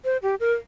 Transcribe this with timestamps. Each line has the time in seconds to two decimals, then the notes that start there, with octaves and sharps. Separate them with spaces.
0.05 C5
0.22 G4
0.40 A#4